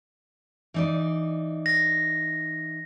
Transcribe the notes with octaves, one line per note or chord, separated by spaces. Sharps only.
E3 D#4 D5
A#6